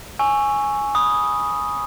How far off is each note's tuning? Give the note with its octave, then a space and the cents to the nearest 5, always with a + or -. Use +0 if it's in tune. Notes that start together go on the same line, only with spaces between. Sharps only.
G#5 +0 C#6 +0 E6 +0
G#5 +0 B5 -15 D#6 +0